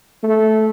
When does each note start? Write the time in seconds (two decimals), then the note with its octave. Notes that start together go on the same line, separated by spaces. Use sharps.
0.23 A3